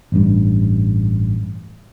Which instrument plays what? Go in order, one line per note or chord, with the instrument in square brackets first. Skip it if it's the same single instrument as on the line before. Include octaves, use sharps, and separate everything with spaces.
[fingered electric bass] A1 G2